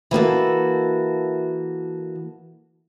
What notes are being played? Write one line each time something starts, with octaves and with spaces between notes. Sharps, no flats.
E3 A#3 F#4 A4